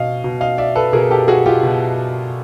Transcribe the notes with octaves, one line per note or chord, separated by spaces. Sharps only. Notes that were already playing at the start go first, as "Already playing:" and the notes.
Already playing: B2 D#5 F5
B2
D#5 F5
D5 E5
A4 B4
B2 G#4 A#4
G4 A4
F#4 G#4
F4 G4
B2